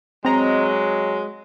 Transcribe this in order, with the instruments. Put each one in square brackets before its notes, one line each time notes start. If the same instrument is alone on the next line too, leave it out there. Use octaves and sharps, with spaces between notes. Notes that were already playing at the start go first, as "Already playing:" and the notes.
[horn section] F#3 G#3 [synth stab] C4 A#5